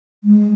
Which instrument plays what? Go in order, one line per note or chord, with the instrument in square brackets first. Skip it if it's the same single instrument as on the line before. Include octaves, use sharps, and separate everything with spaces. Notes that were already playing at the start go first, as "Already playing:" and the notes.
[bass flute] G#3